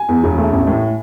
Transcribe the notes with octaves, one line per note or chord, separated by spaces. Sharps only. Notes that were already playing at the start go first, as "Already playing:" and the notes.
Already playing: G#5
E2
E1
A3
A1
A2